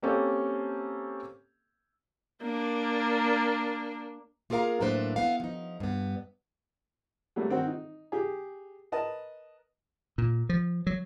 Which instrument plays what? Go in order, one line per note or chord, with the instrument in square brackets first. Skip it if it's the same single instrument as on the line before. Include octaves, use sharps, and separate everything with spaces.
[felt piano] A#3 C4 C#4 G4 A4
[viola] A#3 D4
[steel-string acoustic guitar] A#3 F4 G#4 A#4 F5 A#5
A2 F#3 A#3 D4 B4 C5
B3 E4 F5
F3 D#4
G2 B3
[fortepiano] F#3 G3 A3 A#3
D#3 C4 F#4 C5
D#4
G4 G#4
A#4 B4 D#5 A5
[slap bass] A#2
F3
F#3